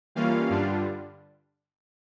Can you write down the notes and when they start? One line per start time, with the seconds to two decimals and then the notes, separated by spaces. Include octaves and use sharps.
0.15 E3 G3 A#3 C#4 F4 F5
0.50 G2 D3 G3 D4 F4